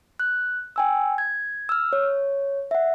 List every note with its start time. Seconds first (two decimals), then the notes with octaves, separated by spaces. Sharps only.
0.20 F#6
0.76 G5 G#5 E6
1.18 G#6
1.69 E6 F6
1.93 C#5
2.71 E5 F#5